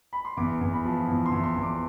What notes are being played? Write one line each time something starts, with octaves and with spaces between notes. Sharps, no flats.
B5
C6
E2 D6
E2
B5
F3
E2
C6
E2
C6
E2
D6